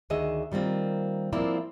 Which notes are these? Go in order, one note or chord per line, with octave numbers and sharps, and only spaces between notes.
D2 D#3 G#4 D#5 E5
D#3 G3 A#3 C4 F4
F3 A#3 C4 E4 F4 D5